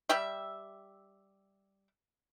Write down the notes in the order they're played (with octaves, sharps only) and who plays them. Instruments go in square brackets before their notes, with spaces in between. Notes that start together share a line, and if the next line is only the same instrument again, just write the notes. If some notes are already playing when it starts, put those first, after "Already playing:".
[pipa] G3 G4 E5